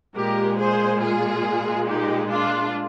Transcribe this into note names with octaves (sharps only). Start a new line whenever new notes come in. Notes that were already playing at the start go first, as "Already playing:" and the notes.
A#2 G#3 G4 A#4
G#4 C5
F4 G#4
D#4 G4
D4 F4